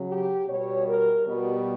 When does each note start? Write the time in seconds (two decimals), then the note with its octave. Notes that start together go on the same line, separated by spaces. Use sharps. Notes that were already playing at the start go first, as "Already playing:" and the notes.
Already playing: C#3 F#3
0.08 G4
0.47 B2 G3 C#5
0.87 A#4
1.26 B2 G3 B3